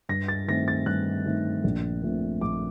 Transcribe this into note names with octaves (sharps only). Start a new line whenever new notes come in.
G2 A#6
A6
D#3 A3 C4 A#6
A6
G2 F#6
D#3 A3 C4
A#1
A#2 A3 C4
A#1 D6